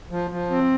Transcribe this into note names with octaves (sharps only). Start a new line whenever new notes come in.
F3
F3
C4